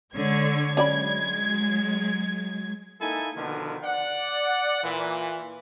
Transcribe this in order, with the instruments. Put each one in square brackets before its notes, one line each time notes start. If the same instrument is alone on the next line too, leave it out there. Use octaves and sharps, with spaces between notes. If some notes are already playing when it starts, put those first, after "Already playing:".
[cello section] D3 G#3 C#5 [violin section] G#6
[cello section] F#3 G#3 [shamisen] C#4 D5 B5
[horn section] A#3 D#4 E4 A4 G#5
B2 D3 D#3 F3
D5 F#5
A#2 E3